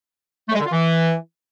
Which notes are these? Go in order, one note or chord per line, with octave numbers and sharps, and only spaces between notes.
A3
G#3
D3
F4
E3